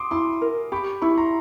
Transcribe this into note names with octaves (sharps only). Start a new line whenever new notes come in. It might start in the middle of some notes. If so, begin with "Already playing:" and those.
Already playing: C6 D6 D#6
E4 C6 D6
A#4
G4 B5 C#6
E4 B5 C#6
A#5 C6